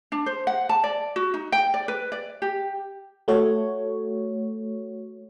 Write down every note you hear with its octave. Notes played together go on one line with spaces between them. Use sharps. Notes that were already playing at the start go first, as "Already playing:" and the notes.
D4
C5
F#5
A5
D5
F#4
D#4
G5
D5
B4
D5
G4
A3 F#4 C#5